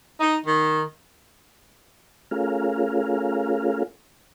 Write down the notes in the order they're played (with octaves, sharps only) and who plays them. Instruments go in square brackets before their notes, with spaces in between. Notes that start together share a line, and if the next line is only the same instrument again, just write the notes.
[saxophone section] D#4
D#3
[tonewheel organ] A3 C#4 F4 G#4 A#4 F5